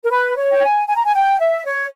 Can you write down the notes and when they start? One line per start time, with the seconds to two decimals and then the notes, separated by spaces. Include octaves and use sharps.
0.04 A#4
0.10 B4
0.37 C#5
0.51 G5
0.62 G#5
0.88 G#5
0.97 A#5
1.05 G#5
1.14 G5
1.39 E5
1.65 C#5